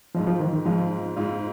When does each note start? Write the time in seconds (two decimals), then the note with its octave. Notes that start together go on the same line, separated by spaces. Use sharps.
0.15 G#2 F3 G#3 F4
0.27 F3
0.40 D#3
0.53 D#3
0.65 G#2 F3 G#3 F4
1.16 G#2 G#3 F4